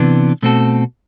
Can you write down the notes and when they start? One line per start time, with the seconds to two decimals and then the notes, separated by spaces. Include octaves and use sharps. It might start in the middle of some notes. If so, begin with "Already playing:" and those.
Already playing: C3 E3 B3 D4
0.43 B2 A3 C4 F#4 A4